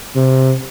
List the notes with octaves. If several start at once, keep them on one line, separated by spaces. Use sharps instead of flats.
C3